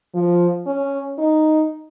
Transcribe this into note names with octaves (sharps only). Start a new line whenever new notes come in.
F3
C#4
D#4